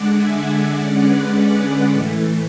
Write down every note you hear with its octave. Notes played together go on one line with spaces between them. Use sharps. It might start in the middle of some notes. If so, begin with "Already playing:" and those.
Already playing: D3 G#3 D4 D5 F#5
E5 G#5
D3 G#3 C#4 D5 F#5
B4 D5
A2 E3 A3